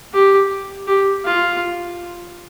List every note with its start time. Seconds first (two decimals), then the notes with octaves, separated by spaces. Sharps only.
0.13 G4
0.88 G4
1.25 F4